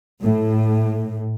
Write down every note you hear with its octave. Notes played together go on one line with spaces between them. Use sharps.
A2